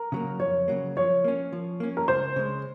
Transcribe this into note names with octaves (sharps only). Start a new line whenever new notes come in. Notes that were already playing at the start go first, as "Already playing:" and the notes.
Already playing: A#4
C#3 F#3 A#3
F2 C#5
C#3 F#3 A#3
F3 C#5
A#3 C#4
F3
A#3 C#4
A#4
C#2 C5
C#3 G#3 C#4